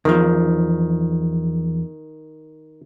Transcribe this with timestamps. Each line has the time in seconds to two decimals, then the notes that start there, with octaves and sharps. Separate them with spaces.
0.05 E2 D#3 F3